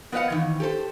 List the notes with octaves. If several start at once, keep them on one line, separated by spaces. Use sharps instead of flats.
B3 B4 C5 D#5 F5 F#5
D#3 E3
G4 A4 C5